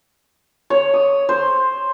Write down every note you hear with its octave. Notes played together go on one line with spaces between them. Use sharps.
C#5
D#6
C5